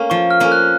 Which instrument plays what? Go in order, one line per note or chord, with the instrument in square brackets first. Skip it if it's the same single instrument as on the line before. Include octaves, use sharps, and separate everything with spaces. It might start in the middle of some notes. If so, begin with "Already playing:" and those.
Already playing: [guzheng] A#3 C#4
[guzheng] F3 [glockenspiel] C#6
[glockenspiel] F6
[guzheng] A#3 C#4
[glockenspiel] F#6